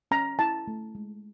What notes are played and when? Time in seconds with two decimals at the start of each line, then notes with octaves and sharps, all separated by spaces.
0.11 C#4 A#5
0.39 E4 A5
0.67 A3
0.95 G#3